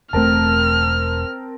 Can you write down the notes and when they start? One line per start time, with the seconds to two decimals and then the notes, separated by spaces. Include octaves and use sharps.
0.13 E1 A3 C4 A#4 A5 F6